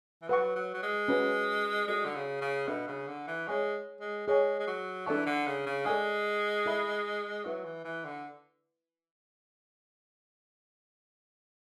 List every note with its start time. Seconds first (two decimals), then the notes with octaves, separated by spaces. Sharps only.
0.22 E3
0.29 F#3 B4 F#5 C#6
0.56 F#3
0.74 F#3
0.83 G#3
1.08 C#4 F#4 B4
1.88 G#3 F#4 A4 D5
2.05 D3
2.15 C#3
2.41 C#3
2.68 B2 D4 A4 E5 B5
2.87 C#3
3.08 D3
3.27 E3
3.47 G#3 G#4 C#5 E5 G#5 C#6
4.01 G#3
4.27 G#3 G#4 C#5 G#5
4.60 G#3
4.67 F#3
5.06 E3 D4 A4 D5 A5 C#6
5.26 D3
5.46 C#3
5.66 C#3
5.86 G#3 A4 D5 G#5
6.66 E4 A4 E5 B5
7.45 F#3 E4 B4 E5
7.65 E3
7.84 E3
8.05 D3